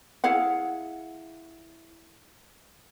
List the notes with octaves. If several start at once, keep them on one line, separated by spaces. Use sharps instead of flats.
E4 G#4 F5 F#5